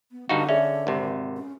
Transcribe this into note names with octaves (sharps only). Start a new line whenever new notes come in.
B3
G2 D3 D#4 F#4 F5 C#7
C#4 G#4 D5 E5
G#1 C3
C#4